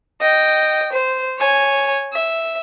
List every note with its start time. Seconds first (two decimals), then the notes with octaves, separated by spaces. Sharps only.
0.21 D#5 G5
0.92 C5
1.38 C#5 G#5
2.13 E5